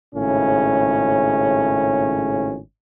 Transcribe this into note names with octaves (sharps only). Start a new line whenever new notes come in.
G#1 A2 C#3 C#4